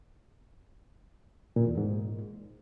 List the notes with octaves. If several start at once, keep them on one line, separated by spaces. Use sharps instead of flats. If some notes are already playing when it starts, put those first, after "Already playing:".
A#2
E2
G#2